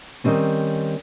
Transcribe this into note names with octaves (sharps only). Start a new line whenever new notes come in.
D#3 F3 G3 C4 C#4